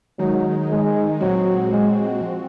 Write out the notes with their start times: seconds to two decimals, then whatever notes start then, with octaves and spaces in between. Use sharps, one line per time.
0.19 D#3 F#3 G#3 D#4
0.70 G#3
1.20 A#2 F#3 G#3 C4 F#4
1.71 G#3
2.21 F3 C4 F#4